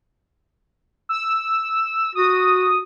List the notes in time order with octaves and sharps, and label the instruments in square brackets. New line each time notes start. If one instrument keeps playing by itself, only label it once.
[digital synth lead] E6
[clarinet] F#4 [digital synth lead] D#6